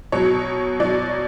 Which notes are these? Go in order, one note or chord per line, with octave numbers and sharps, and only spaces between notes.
B2 F#3 C#5
B2 F#3 D5